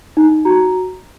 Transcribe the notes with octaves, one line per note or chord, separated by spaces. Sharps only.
D#4
F#4 A#5